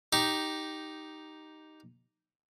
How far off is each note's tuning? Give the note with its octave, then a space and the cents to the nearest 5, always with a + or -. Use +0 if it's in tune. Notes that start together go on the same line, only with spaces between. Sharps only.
D#4 +0 G4 -5